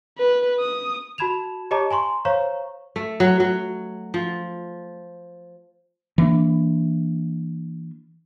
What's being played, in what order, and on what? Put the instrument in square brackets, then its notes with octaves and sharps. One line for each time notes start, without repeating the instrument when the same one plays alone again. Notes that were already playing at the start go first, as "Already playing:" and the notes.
[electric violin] B4
D#6
[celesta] F#4 A5 B5 G#6 E7 F7
G4 C#5 D#5 A5 A#5 D6
G#5 A#5 C6 C#6
C5 C#5 F5 A#5 C#6
[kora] A3
F#3
F#3
F3
[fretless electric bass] E3 A#3 D4